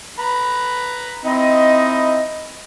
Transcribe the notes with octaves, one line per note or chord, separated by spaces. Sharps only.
B4 A#5 B5
C4 D#4 E4 D#5